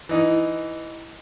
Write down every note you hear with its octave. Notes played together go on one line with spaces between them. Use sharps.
E3 D#4